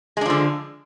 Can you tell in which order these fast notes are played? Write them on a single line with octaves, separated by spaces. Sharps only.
G#3 D4 F3 D3